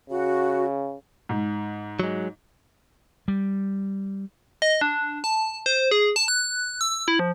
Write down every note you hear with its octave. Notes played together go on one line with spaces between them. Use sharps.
C#3 F#4
G#2
F#3 G#3
G3
D#5
D4
A5
C5
G#4
A5
F#6
E6
E4
F3